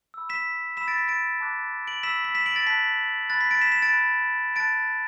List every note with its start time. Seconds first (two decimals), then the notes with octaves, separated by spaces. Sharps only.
0.14 B5 E6
0.29 B6 E7
0.77 B5 E6 B6 E7
0.88 A6 D7
0.98 B6
1.08 A6 D7
1.40 A5 D6 F#6
1.87 D7 F#7
2.03 B5 E6 B6 E7
2.25 B6
2.35 B6 E7
2.46 D7 F#7
2.56 A6 D7
2.66 A5 F#6 B6
3.30 B5 F#6 A6
3.41 B6
3.51 A6 D7
3.61 B6 E7
3.72 B6 E7
3.82 A6 D7
3.93 B5 F#6
4.56 A5 F#6 A6 D7